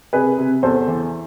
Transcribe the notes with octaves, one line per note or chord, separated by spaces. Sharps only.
C3 G#4 B4
C3
E2 A4 C5
E3